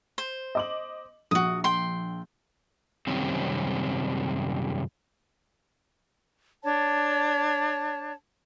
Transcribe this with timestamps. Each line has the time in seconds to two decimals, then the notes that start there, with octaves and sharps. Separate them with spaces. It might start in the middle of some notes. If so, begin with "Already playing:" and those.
0.18 C5
0.55 D#5 D6 F#7
1.31 A#1 F#4 D#6
1.64 G5 C6
3.07 F#2 C3 D#3 G3 C4 C#4
6.64 D4 C#5 A5